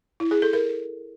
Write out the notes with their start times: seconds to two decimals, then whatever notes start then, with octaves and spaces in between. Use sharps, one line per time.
0.20 E4
0.31 G#4
0.42 A4
0.53 A#4